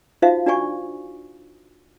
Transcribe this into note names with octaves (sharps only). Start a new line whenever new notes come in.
D#4 F4 F#4 C5 E5 F5
D4 F#4 D5 G#5 C#6